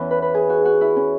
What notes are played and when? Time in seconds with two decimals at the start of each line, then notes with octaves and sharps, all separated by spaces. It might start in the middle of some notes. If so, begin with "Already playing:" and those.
Already playing: E2 E3 C#4
0.11 B4
0.22 B4
0.34 G#4
0.50 F#4
0.65 F#4
0.81 E4
0.96 C#4